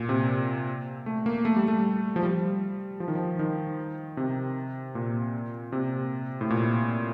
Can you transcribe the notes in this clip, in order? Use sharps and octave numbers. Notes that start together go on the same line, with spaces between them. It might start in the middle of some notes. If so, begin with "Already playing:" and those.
Already playing: A#2
C3
A3
A#3
A3
G3
A3
F3
G3
F3
D#3
F3
D#3
C3
A#2
C3
A2
A#2